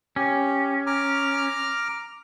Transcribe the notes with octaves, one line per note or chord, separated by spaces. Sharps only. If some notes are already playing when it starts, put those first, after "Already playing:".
C#4 G4
A#5 D6 F6